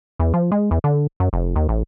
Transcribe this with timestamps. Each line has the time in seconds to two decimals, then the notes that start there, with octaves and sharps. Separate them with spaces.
0.19 E2
0.34 F3
0.52 G#3
0.71 E2
0.84 D3
1.20 F#2
1.33 F1
1.56 D#2
1.69 A1